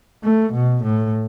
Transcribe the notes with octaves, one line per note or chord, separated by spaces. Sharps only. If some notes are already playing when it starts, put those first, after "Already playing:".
A3
B2
A2